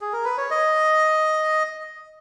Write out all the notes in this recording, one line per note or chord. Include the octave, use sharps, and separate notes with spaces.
G#4
A#4
B4
C#5
D#5